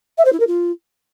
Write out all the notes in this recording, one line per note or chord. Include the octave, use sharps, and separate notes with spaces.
E5
C5
E4
A#4
F4